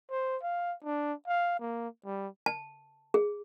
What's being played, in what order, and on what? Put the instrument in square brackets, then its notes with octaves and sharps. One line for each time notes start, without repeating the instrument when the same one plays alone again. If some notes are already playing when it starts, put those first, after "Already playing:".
[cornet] C5
F5
D4
F5
A#3
G3
[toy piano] A5
G#4